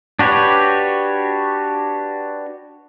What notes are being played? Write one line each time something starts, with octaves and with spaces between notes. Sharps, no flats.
D4 F#4 G4 B4 C#5